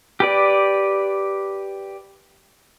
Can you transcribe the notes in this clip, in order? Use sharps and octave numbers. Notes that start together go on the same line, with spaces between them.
G4 B4 D5